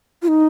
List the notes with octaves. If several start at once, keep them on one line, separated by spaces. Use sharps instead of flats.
F4
D#4